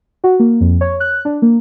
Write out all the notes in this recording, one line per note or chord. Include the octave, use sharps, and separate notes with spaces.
F#4
A#3
F2
C#5
F#6
D4
A#3